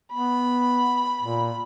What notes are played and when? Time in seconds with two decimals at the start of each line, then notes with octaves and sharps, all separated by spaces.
0.14 B3 B5
1.21 A#2